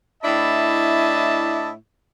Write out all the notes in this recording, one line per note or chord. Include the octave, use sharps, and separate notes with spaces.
A2 D4 E4 D#5 A5